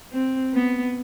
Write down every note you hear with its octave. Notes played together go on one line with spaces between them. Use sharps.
C4
B3